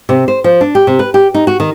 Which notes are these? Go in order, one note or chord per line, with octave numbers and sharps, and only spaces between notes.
C3
C5
F3
D4
G4
C3
B4
G4
D#4
F#4
D#3